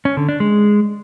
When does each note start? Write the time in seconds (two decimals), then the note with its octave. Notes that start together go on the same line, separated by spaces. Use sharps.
0.05 C#4
0.17 D3
0.29 D4
0.40 G#3